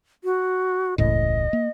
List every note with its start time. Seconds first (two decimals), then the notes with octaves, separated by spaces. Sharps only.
0.24 F#4
0.98 E1 C#2 A2 D#5
1.53 A#3